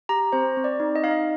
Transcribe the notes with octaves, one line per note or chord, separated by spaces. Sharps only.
G4 A#5
C4 C5
C4
D5
D#4
D#5
D#4 F5
D#5